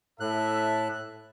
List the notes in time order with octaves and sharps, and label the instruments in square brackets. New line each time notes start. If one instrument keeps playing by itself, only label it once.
[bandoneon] A2 F#6 [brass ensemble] A4 E5 A5